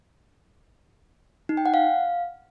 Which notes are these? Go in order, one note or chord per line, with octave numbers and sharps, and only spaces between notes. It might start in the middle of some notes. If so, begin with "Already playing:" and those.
D#4
G5
F#5
F5